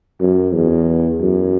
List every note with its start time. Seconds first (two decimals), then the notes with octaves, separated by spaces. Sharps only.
0.21 F#2
0.54 E2
1.21 F#2